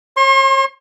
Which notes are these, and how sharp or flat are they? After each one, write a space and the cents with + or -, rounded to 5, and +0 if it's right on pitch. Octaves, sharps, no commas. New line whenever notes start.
C#5 -40 C6 +40